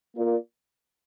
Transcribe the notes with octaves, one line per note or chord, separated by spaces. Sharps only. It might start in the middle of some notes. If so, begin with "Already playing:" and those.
A#3 F4 A#4 D5